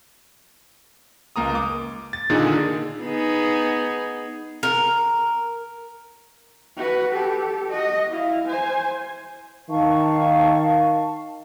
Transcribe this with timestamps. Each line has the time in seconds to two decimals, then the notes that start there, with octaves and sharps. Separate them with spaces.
1.36 C#2 A#3 A#5 D#6
1.55 D6
2.13 A6
2.30 A#2 D3 D#3 D#4 G#4 A4
3.01 B3 D#4 G#4
4.63 A#4
6.77 F#4 B4
7.13 G4 A4
7.70 F#4 D#5
8.09 E4 F5
8.48 C5 G#5
9.70 D#3 F5 A5 C#6